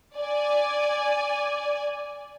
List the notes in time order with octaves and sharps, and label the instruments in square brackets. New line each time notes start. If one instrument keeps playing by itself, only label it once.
[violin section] D5 G#5